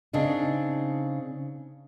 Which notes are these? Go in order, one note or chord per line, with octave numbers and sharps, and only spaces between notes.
C#3 C4 D4 D#4